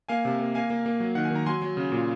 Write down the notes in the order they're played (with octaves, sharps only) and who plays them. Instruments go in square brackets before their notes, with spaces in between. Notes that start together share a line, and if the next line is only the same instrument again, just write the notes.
[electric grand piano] A#3 F5 G#5
C3
A#3
A#3 F5 G#5
A#3
A#3
F#3
D#3 F#5
G#5
D#3 A#5
F#3 G#5 C6
F#3
C#3
A#2